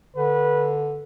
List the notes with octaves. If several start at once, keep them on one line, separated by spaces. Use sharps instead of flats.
D3 B4